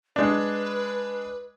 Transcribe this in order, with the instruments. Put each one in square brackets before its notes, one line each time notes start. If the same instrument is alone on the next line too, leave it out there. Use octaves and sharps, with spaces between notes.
[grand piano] G#3 D4 [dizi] B4